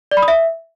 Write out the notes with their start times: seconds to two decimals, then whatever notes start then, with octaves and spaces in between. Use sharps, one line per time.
0.11 D5
0.17 B5
0.22 D#6
0.28 E5